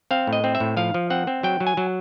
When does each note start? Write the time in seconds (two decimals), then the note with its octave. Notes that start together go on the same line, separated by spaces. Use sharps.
0.11 C4 F5
0.27 A2
0.33 D#5
0.44 C4
0.55 E5
0.60 A2
0.77 F3 F5
0.94 F3
1.10 C4 F#5
1.27 C4
1.43 F#3 G5
1.60 F#3
1.67 G#5
1.77 F#3